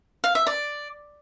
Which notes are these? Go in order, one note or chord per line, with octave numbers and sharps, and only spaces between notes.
F5
E5
D5